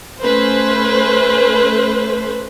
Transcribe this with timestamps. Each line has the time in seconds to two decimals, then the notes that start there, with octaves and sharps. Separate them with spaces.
0.21 A3 C#4 B4 C5